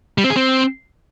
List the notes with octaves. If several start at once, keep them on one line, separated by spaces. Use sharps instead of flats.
G3
C4
G#4
C4